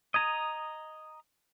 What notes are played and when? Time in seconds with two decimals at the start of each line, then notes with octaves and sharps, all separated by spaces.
0.14 D#5 A#5 D#6 G#6 D#7